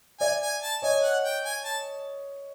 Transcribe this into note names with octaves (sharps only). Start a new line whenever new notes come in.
D5 E5 G#5
G#5
A5
C#5 D#5 G#5
F#5
G5
G#5
A5